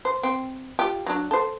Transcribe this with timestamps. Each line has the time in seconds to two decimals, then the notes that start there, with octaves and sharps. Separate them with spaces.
0.05 C5
0.23 C4
0.79 F4 G4
1.06 F#3 D4
1.31 A4 C5